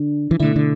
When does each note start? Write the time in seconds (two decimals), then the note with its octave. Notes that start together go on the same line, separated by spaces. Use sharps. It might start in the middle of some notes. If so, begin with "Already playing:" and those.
Already playing: D3 D4
0.31 E3
0.39 B2 D3 A3 E4
0.56 D3